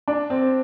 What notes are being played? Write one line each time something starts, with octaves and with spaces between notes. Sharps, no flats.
D4
C4